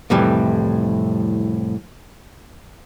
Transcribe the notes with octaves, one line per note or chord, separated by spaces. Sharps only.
C2 F2 A2 E3 G3